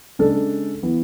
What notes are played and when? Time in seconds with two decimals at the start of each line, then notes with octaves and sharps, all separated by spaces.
0.19 C#3 G#3 D4 A4
0.83 E3 B3